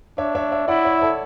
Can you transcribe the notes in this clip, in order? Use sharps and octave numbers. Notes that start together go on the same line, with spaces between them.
D4 C#5 E5
C#5 E5
C#5 E5
E4 D5 F#5
C#5 E5
A4 C#5